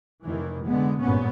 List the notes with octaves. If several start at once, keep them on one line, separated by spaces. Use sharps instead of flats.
F1 D#3 E3
D3 G#3 B3
G#1 G2 A#2 B3 C#4